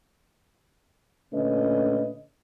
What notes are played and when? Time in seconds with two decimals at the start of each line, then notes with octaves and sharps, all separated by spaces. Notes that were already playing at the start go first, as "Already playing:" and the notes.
1.34 A#2 D3 A3 C#4 B4 D#5